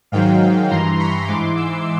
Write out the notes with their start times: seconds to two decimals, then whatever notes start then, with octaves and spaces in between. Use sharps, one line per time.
0.12 G#2 D#3 F#3 F5 G5
0.70 G2 E3 A#5 C6
0.99 B5 C#6
1.28 G#2 E3 C6 D6
1.56 D6 E6